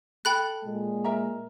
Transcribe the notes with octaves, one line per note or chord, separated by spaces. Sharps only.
A4 G5 B5 F#6
A#2 G#3
A#4 E5 A#5